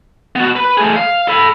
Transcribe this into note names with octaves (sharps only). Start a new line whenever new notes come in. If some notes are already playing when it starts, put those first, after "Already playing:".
B3 F#4
B4
A3 G#4
F5
A4 B5